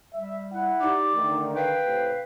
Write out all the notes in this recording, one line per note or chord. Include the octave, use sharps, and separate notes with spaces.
G3 E5
E4 F#5
D#4 G4 D5
D3 D#3 A3
B4 F5 G5
A2 C3